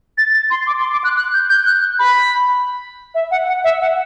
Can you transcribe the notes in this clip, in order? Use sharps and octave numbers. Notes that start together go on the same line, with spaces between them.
A6
A6
C6
D6
C6
D6
F#6
F#6
G6
G6
F#6
B5
E5
F#5
F#5
E5
F#5